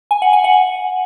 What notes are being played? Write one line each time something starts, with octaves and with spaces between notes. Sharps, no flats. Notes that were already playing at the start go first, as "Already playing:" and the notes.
G#5
F#5
G#5
F#5